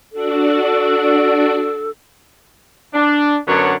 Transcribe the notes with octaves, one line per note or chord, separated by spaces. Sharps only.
D4 F#4 A4 D5
D4
F#2 D3 F#3 B3 D4 C#5